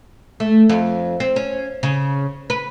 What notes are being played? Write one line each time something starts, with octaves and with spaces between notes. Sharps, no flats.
A3
F2
C4
C#4
C#3
B4